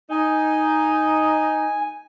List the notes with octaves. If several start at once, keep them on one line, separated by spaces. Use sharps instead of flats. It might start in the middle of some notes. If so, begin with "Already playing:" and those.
D#4 G#5